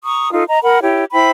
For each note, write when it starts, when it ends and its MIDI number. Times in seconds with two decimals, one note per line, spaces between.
0.04 0.31 82
0.04 0.31 85
0.04 0.31 87
0.32 0.43 63
0.32 0.43 65
0.32 0.43 69
0.47 0.59 75
0.47 0.59 82
0.63 0.79 70
0.63 0.79 78
0.63 0.79 83
0.81 1.04 64
0.81 1.04 67
0.81 1.04 73
1.13 1.30 64
1.13 1.30 72
1.13 1.30 79
1.13 1.30 83